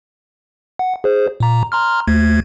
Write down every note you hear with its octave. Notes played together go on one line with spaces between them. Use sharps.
F#5
G#4 C5
A#2 A#5
A#5 C6 F6
D#2 A3 G#6